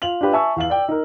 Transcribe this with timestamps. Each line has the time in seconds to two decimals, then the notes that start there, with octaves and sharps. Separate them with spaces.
0.02 F4 F7 F#7
0.21 D4 F4 G4 B4
0.33 E5 G#5 A5 C#6 E6
0.56 E2 F5 F#7
0.70 D5 G5
0.88 D#4 A#4